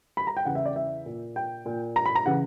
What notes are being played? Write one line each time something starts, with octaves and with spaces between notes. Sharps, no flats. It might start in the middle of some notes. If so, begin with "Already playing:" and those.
B5
A#5
G5
E2 C#3 E3 F#5
E5
D5
E5
A#2
G5
A#2
A#5
B5
A#5
C#3 E3 F#5